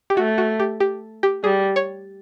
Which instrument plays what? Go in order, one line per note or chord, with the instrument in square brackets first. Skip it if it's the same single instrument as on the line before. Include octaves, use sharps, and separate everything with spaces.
[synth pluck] G4
[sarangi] A3 [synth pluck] F#4
[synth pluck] F#4
G4
G4
G4
[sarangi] G3 [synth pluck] G#4
[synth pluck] C#5